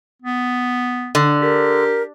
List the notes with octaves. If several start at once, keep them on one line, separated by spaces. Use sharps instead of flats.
B3
D3
G4 A#4